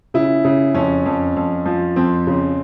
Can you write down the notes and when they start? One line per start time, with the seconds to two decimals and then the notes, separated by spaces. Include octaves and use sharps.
0.14 C#3 E4
0.44 C#3
0.75 F2 C#4
1.06 F2
1.36 F2
1.66 F3
1.96 F2 C4
2.27 C#3